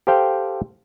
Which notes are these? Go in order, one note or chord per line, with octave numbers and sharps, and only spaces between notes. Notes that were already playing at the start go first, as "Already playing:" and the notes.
G4 A4 C5 F5 G5